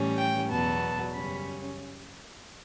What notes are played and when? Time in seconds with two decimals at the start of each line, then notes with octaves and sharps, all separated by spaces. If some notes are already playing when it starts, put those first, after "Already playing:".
Already playing: A2 E3 G3 C#4
0.17 G5
0.49 E2 B2 F#3 B3 A5
1.13 F#2 C#3 G3 C#4 B5